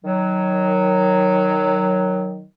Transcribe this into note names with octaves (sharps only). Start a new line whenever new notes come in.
D#3 F#3